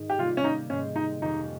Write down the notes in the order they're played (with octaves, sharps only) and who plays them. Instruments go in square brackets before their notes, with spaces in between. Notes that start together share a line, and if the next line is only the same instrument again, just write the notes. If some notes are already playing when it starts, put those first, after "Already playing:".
Already playing: [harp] G#2 D#3
[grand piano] G4
[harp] C3 G3 A#3 [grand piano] F4
[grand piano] C#4
D#4
[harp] G#2 D#3 G#3 C4 [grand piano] C#4
[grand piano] D#4
[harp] F2 D#3 A#3 C#4 G4 [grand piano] D#4